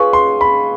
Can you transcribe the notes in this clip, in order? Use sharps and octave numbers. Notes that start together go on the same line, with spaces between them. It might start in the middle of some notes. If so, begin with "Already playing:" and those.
Already playing: C#4 F4 G#4 B4 C#6
C6
B5